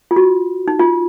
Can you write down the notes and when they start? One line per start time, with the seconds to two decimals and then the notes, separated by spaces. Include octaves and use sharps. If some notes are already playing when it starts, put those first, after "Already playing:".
0.11 F4
0.16 F#4
0.68 D#4
0.79 F4